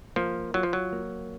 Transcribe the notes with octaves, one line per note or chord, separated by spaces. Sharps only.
F3 A#3
F#3 F4
F3
F#3
A#3